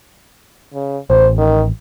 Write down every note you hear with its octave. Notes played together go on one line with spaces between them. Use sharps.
C#3
A1 C5
D#3